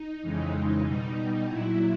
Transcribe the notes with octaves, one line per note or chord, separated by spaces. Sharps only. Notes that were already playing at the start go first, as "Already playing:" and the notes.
Already playing: D#4
F2 C#3 E3 G#3
B2 G3 D#4
A#2 F#3 E4